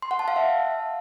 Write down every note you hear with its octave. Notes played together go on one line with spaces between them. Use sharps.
C6
F#5
A5
F5
E5